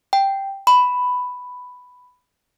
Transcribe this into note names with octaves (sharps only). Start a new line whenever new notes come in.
G5
B5